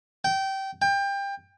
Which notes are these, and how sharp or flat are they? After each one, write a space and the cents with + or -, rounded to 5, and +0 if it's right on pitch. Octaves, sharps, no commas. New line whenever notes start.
G5 -20
G5 +25